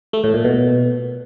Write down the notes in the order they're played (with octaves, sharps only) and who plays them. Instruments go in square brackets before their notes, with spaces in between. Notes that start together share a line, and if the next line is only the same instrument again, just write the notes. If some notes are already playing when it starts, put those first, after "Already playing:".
[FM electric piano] A3
A2
A#2
B2